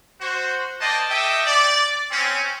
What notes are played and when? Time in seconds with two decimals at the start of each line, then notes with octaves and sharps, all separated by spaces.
0.20 F#4 C5
0.80 A#3 C5 D5 D#5 G5 A5
1.09 G4 A4 D#5 E5 G5
1.45 D5
2.11 C4 C#4